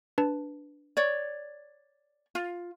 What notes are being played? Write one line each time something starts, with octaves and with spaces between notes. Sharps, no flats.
D4 B4 A5
C#5 D5
F4